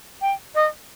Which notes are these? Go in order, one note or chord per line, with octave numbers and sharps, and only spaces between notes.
G5
D#5